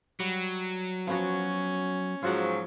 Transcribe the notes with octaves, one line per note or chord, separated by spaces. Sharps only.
F#3 G3
F3 B3 C#4 F#4
G#2 F3 F#3 F4 F#4 F#5